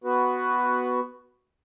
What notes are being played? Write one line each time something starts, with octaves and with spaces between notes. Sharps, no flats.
B3 F#4 B4